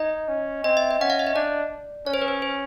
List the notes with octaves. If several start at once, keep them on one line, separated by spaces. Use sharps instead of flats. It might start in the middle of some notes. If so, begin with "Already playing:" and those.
Already playing: D#4 D#5
C#4
C4 D#5
E5
D#5
C#4 F#5
F5
E5
D#5
D4 D5
C#4 C#5
C5
B4
C5
C5